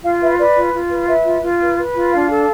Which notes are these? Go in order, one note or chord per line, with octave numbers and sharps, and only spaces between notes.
F4 F5
B4 E5
B4 D5
F4
F4
B4
B4 E5
F4
F4
B4
B4
F4
D4 F5
A4